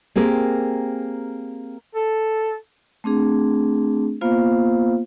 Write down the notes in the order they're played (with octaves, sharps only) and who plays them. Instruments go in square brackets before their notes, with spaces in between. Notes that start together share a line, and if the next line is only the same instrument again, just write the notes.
[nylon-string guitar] A#3 C4 G4 G#4 A#4
[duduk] A4
[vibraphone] A3 C4 D4 G#4
A#3 B3 F4 C5 F5